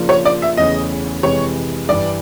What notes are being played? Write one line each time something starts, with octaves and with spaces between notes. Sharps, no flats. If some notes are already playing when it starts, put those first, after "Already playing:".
Already playing: C#3 F3 A#3 D4 F4
C#5
D5
E5
E2 C#3 E3 A3 C#4 D#5
F2 C3 E3 G#3 C#5
G2 E3 G3 D5